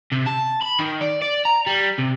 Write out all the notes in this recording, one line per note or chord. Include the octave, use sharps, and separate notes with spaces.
C3
A5
B5
D#3
D5
D5
A#5
G3
C3